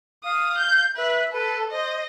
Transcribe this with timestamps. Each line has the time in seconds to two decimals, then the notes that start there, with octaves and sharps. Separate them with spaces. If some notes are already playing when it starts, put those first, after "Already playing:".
0.24 F5 D#6
0.58 G6
0.97 B4 E5
1.33 A4 B4
1.71 C5 D#5